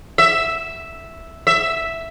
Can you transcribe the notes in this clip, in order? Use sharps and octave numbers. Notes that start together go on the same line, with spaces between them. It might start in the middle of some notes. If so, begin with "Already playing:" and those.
E5
E5